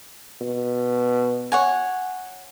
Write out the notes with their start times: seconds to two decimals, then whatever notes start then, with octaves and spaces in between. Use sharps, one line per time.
0.41 B2
1.52 C#5 F#5 G#5